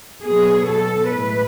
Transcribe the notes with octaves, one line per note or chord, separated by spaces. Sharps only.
B2 F#3 B3 G#4
A4
A2 E3 G#3 B4